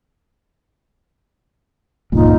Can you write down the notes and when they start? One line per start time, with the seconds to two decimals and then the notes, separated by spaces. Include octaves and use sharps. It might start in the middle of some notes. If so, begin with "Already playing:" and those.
2.12 C#2 G2 A#2 D#4 F4